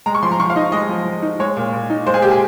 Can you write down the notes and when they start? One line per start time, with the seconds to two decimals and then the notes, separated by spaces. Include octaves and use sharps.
0.06 G#3 A#5
0.15 C#6
0.23 F3 C6
0.31 A#5
0.40 F3 C#6
0.50 F5
0.56 D#4 D#5
0.72 G#3 D#5
0.89 F3
1.05 F3
1.23 D#4
1.39 G#3 C#5
1.56 A#2
1.73 A#2
1.90 D#4
2.07 G#3 C5
2.14 G#4
2.22 A#2 G4
2.31 G#4